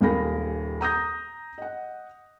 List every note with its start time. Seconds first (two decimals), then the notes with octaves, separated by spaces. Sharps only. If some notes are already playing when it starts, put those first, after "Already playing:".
0.01 D#1 D#2 G#4 A#4 B5 A#6
0.81 A#5 D#6 G6 A#6
1.58 D#5 F#5